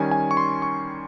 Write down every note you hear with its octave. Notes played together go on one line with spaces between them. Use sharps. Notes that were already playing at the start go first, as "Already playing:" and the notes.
Already playing: D#3 G3 C#4 G#5
G#5
C#6
C6
C#6